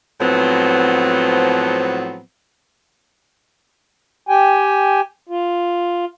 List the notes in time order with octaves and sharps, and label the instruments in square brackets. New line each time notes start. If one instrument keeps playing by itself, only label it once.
[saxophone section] A2 F3 F#3 B3 C4
[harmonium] G4 G5 G#5
F4